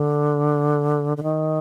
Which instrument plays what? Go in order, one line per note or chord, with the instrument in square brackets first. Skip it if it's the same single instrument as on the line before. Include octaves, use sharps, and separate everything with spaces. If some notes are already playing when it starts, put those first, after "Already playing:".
Already playing: [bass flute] D3
D3
D#3